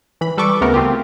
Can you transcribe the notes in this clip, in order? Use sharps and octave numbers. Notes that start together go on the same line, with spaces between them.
E3 B5
G3 A4 B4 C#6 D6
D2 C#3 A3 B3 A#4
C4 F4 G4